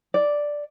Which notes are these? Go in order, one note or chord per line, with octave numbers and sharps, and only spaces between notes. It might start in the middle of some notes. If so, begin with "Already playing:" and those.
D5